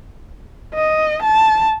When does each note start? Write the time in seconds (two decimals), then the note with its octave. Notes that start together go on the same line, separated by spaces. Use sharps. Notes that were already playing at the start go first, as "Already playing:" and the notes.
0.75 D#5
1.22 A5